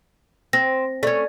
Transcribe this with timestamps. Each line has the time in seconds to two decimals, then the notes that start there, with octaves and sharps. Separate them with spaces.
0.53 C4 A#6
1.03 A3 C#4 D5 G#6